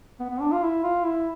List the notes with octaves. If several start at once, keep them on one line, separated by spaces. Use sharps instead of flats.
B3
B3
D4
F4
E4
F4
E4